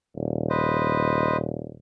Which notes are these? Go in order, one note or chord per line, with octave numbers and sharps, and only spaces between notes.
D#1
B4 C5 D#5